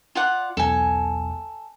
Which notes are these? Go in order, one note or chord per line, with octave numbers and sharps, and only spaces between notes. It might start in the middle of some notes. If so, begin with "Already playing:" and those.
F4 D5 F#5
B1 E2 A4 G#5